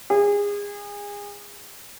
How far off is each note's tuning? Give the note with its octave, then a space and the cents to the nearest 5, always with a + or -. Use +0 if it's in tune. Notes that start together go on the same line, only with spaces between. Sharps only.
G#4 -30